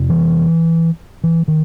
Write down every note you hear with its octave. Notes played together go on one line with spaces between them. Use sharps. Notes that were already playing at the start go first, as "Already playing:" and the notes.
Already playing: F2 C3
E3
E3
D#3